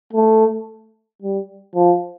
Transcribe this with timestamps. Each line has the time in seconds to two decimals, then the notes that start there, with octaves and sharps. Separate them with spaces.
0.13 A3
1.22 G3
1.76 F3